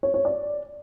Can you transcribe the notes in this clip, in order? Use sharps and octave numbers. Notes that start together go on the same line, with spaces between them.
C#5
C#5
D5